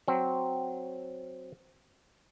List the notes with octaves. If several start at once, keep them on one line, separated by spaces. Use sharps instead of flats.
F#3 C4